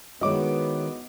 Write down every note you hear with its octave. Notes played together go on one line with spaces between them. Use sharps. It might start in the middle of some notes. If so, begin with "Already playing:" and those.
D#3 G#3 B3 E4 F#4 C#5 D#5 D6